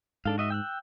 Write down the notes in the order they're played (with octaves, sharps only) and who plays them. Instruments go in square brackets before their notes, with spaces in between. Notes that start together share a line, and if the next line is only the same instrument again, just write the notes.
[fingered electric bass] G#2 [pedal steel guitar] D4 A4 F5
[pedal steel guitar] F#4 D#5 E5
G5 E6 F#6